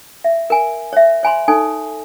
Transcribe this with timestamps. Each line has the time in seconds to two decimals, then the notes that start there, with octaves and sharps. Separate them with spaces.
0.24 E5
0.50 A#4 G#5
0.93 C#5 E5
1.23 C#5 G#5 B5 C6
1.48 D#4 A4 C#5 G#5